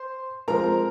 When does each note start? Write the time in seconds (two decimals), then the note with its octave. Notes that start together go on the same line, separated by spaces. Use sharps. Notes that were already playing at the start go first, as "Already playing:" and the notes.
Already playing: C5 C6
0.48 F3 G#3 C4 A#4 A#5